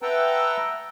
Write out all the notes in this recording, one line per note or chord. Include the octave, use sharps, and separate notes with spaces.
B4 E5 F#5 G5 A5 A#5